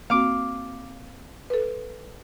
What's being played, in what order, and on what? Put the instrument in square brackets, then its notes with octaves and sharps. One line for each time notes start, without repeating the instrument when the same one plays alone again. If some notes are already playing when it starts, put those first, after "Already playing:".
[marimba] A#3 C4 F#4 [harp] F5 D6
[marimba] A4 B4